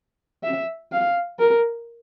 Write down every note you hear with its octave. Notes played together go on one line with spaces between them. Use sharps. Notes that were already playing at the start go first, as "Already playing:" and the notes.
E5
F5
A#4